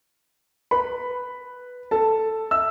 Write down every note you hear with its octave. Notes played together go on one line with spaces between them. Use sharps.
B4 B5
A4 A5
E5 E6